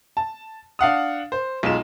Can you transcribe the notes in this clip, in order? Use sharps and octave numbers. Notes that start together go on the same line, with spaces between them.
A5
D4 F5 F#5 D#6
C5
B1 G#3 F4 E7